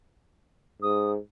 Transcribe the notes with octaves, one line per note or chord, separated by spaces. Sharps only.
G#2 D#6